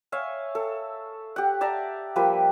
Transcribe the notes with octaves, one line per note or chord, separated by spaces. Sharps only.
C#5 E5 F5 G#5
A4
G4 F#5
D5 E5 A5 A#5
F3 G3 A#3 B4